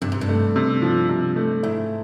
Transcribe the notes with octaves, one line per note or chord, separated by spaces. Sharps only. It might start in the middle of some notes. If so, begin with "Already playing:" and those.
G2 C3
G#2
G2
A3
C3
F3
C3
A3
G#2 E4